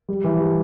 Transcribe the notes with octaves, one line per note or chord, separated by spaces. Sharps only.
G3
E3
G3